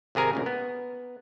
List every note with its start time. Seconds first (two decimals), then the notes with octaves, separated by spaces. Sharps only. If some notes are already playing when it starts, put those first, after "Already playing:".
0.15 G#1 C3 G#4 A#4 G#5
0.33 D2 A#2 C#3
0.46 B3